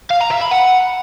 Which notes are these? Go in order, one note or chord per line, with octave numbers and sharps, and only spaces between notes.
F5
A#5
E5
B5
F#5